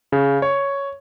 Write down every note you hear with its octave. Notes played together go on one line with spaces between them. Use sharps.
C#3
C#5